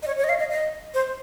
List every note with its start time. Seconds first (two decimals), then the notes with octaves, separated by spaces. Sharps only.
0.03 D#5
0.07 C#5
0.18 C#5
0.24 D#5
0.29 F5
0.40 D#5
0.51 D#5
0.94 C5